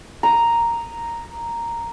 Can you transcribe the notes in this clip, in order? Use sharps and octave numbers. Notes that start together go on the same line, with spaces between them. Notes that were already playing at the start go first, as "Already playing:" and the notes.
A#5 D#6